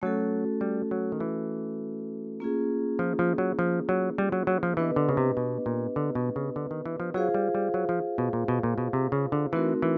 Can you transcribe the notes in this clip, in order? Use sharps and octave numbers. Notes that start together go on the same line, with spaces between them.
F#3 A3 C#4 F#4 A4
G3
F#3
D#3
E3
A#3 C#4 F4 G#4
F3
F3
F#3
F3
F#3
G3
F#3
F#3
F3
E3 B3 D4 G4 B4 D#5
D3
C#3
C3
B2
A#2
D3
B2
C#3
D3
D#3
E3
F3
F#3 F4 G#4 C5 F5
G3
G3
F#3
F3
B2
A#2
B2
A#2
B2
C3
C#3
D3
E3 A3 C4 D#4 F#4 A#4
E3